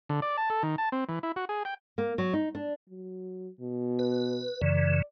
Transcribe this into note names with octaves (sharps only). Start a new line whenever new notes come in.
D3
D5
A5
A4
D#3
A5
C4
E3
E4
F#4
G#4
G5
A#3
F#3
D#4
D4
F#3
B2
B4
F#2 C#3 E3 D5